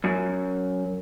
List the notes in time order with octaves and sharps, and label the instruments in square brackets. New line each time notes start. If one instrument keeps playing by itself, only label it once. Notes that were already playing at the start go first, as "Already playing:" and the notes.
[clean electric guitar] F#2